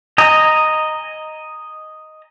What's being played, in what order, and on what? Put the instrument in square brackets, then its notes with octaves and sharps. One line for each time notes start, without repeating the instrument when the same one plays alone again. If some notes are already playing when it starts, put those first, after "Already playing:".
[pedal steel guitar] D#5 G#5 A#5